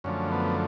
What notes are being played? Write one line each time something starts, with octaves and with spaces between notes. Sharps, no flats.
F#2 D3 F3 A3 C#4
B3